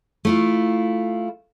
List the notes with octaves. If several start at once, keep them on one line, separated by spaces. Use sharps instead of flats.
A3 E4 F4